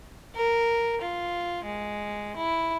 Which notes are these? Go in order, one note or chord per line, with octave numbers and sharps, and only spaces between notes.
A#4
F4
G#3
E4